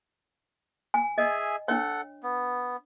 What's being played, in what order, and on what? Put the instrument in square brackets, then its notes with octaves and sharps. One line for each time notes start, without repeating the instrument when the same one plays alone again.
[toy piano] G#5
[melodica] G#4 E5 G#5 [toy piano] D#5
[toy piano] D4 C#5 [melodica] A4 F#5
[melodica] B3